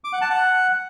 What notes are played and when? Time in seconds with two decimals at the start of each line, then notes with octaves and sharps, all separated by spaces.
0.04 D6
0.13 F#5
0.21 A5
0.30 F#5